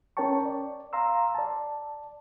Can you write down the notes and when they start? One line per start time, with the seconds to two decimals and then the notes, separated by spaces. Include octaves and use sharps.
0.17 C#4 A#4 C#5 G5 A5 C#6
0.45 D5
0.93 F5 A#5 C6 E6
1.35 D5 A5